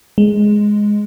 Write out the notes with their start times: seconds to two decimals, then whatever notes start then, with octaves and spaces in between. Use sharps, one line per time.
0.18 G#3